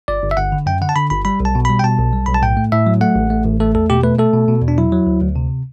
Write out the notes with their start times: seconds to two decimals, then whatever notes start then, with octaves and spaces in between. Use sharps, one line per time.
0.08 G1 D5
0.23 G1
0.31 E5
0.37 G1 F#5
0.52 D3
0.66 F#2 G5
0.82 D3 F#5
0.89 A5
0.96 D3 B5
1.10 G1 B5
1.25 G3 B5
1.40 B1
1.45 A5
1.55 B2
1.65 G3 B5
1.79 G5
1.84 B2 A5
1.99 B1
2.13 G3
2.26 B1 B5
2.35 A5
2.42 A2 G5
2.57 A3
2.72 A2 E5
2.87 F#3
3.01 A3 F#5
3.15 A1
3.30 A3
3.45 A1
3.60 A3 A4
3.74 E2 A4
3.90 B2 G4
4.04 A3 B4
4.19 A3 A4
4.33 B2
4.48 B2
4.62 E2
4.68 D4
4.78 F#3 E4
4.93 F#3
5.07 D2
5.22 D2
5.36 C3